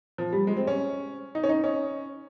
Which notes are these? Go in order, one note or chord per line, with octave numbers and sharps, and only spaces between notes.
F3
G3
G#3
C4
C#4
D#4
C#4
D#4
C#4